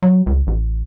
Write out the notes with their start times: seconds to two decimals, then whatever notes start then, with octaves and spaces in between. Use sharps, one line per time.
0.02 F#3
0.26 C#2
0.47 A1